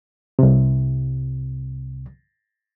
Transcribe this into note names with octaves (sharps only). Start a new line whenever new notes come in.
C2 C3